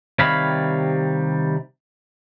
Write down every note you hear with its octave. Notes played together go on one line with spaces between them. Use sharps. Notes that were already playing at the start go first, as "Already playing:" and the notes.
C3 D#3 G3 C#5 F5 B5